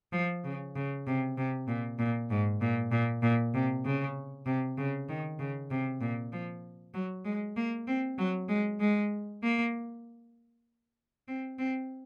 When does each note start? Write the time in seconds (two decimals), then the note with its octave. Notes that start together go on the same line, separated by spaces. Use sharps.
0.13 F3
0.44 C#3
0.76 C#3
1.07 C3
1.37 C3
1.68 A#2
1.99 A#2
2.30 G#2
2.61 A#2
2.92 A#2
3.23 A#2
3.54 C3
3.85 C#3
4.46 C3
4.78 C#3
5.09 D#3
5.39 C#3
5.71 C3
6.01 A#2
6.32 F3
6.94 F#3
7.25 G#3
7.56 A#3
7.87 C4
8.18 F#3
8.49 G#3
8.80 G#3
9.43 A#3
11.28 C4
11.59 C4